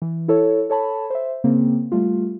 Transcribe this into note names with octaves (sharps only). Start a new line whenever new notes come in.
E3
E4 A4 C#5
A4 C#5 A5 B5
C5 E5
C#3 A#3 C4
G3 A3 F4